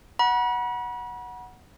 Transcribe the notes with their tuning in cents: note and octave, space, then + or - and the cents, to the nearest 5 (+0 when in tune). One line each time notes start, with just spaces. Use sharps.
F#5 +0 B5 -40